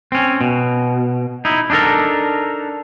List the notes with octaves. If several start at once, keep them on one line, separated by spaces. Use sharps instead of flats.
C4 C#4
B2
D#4 E4
D4 D#4 F4 A4 A#4